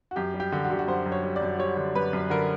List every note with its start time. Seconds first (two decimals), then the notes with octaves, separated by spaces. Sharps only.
0.11 F#4
0.16 F#2 G4
0.34 G3
0.40 G4
0.52 D3
0.64 F#4
0.70 D3 G4
0.79 F#4
0.88 F#2 C5
1.06 F#2
1.12 C#5
1.23 G3
1.36 D5
1.42 F#2
1.59 G3 C#5
1.77 D3
1.95 F#2 B4
2.13 F#2
2.30 D3 A#4